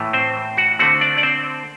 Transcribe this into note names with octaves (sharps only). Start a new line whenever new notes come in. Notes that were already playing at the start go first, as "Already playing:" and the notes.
Already playing: A2 E3 A3
C4 C5
F#4 F#5
D3 A3 C4 F#4 F#5
D4 D5
D5
C4 C5